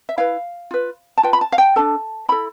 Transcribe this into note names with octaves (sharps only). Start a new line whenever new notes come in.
E5
E4 B4 F5
F4 B4
A5
F4 B4 G5
B5
A5
F5
G5
D4 A4 A5
E4 A4 B5